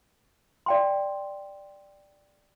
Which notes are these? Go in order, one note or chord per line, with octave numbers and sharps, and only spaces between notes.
D5 G5 C6